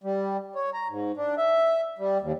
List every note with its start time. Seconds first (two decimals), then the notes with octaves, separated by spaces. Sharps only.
0.03 G3
0.55 C#5
0.74 A#5
0.89 G#2
1.17 D4
1.38 E5
1.98 G3
2.21 D#2